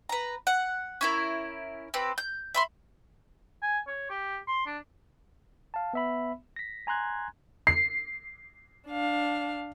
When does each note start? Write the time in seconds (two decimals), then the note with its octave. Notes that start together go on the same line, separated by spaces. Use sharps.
0.09 B4 A#5
0.47 F#5
1.01 C#4 E4 A#4
1.94 C4 G4 B4
2.18 G6
2.54 E5 B5 C6
3.62 G#5
3.87 C#5
4.10 G4
4.48 C6
4.66 D4
5.74 F5 A5
5.93 B3 E5 B5
6.56 A#6 B6
6.87 G#5 A#5 C6 F#6 G#6
7.67 C7
8.88 D4 F5